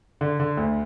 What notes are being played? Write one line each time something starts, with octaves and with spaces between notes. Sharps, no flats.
D3
D3
D2